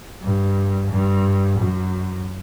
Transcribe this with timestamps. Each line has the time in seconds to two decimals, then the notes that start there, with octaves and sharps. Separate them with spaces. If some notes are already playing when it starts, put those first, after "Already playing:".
0.23 G2
0.89 G2
1.57 F#2